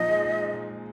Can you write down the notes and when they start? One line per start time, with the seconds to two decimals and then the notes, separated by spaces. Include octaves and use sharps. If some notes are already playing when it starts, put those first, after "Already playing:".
Already playing: A#2 F3 D#4 D#5
0.08 G#3
0.24 G#3
0.39 D#4
0.53 A#2
0.69 G#3